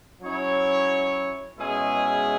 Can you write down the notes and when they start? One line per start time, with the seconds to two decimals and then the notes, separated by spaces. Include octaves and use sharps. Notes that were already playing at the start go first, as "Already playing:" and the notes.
0.21 F#3 C#4 E4 C#5
1.58 B2 G#3 C#4 E4 G#4